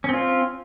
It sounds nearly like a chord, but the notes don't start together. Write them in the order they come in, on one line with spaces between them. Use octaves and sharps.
C#4 C4 F4